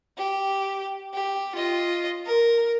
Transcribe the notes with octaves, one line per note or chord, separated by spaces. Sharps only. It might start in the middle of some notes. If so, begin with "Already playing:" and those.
G4
G4
F4 D#5
A#4